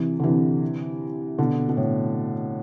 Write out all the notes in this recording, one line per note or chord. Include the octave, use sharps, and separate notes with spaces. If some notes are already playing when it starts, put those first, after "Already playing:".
Already playing: C3 E3
D3
C3 E3
B2 D3
B2
A2